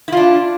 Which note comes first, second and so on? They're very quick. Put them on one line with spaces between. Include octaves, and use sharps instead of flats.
E4 F4 D4